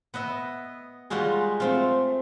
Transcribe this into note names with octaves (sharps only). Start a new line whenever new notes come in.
B3 B4 D#5 E5
G3 G#3 F4 F#4 G#4
A3 C4 F4